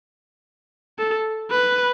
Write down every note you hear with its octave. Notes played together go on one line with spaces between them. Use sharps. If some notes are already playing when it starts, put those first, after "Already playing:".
A4
B4